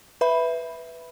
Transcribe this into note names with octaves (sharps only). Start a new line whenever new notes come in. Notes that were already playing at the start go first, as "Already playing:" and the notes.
B4 E5 B5